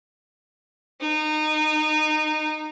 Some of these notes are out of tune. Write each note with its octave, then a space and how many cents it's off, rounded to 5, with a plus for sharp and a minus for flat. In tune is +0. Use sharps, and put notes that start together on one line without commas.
D#4 -20